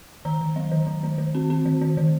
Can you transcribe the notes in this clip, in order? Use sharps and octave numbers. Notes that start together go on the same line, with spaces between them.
D#3 A#5
D#3
F#3
D#3
D#3
D#3
D#3
C4
C4
D#3
D#3
D#3